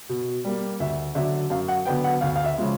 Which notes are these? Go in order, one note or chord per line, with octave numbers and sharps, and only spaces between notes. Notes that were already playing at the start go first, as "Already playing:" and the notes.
B2
G3 A#3
D2 E5
D3 F#3 E5
F#2 F5
F#5
D3 F#3 B3 G5
F#5
D2 F5
F5
E5
C#3 F3 G#3